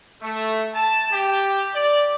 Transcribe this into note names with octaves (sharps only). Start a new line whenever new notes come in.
A3
A5
G4
D5